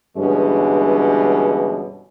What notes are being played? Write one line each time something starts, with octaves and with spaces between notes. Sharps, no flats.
G2 B2 D3 E3 G#3 C#4